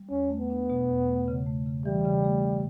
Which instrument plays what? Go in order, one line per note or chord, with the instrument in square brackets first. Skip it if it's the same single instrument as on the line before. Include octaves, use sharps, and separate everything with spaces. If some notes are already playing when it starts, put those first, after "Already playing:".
Already playing: [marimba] G3
[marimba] E2 [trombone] C#4
[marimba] A3
[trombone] B3
[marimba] D4
B2
E2
A3
C#3
A3
C#3
[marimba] E3 [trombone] G3
[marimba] C#3
A3
G2